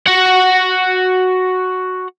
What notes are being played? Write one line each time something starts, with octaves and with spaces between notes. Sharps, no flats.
F#4 F#5